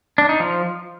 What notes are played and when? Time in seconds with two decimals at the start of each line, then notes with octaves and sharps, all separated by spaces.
0.18 D4
0.29 D#4
0.40 F3